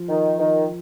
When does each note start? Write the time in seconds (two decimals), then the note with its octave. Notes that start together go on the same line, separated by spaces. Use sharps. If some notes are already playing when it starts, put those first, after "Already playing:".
Already playing: F3
0.09 D#3
0.39 D#3